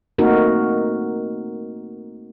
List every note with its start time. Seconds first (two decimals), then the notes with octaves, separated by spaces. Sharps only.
0.18 A3 A#3 C4 D#4 F#4 A#4